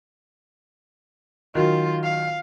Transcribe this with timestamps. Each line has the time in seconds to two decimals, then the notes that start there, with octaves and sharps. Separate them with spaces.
1.55 D#3 F#3 F4
2.04 F5